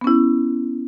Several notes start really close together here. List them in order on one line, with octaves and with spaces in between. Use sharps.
B3 C#4 E4